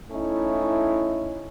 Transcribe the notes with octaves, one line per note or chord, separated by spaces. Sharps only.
A3 C#4 D#4 E4